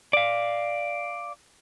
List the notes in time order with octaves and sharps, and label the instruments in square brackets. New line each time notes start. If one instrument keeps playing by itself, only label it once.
[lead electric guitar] D5 F5